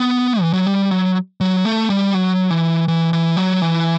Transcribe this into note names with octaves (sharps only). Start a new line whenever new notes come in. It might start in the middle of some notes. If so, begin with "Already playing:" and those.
Already playing: B3
E3
F#3
G3
F#3
F#3
A3
G3
F#3
E3
E3
E3
F#3
E3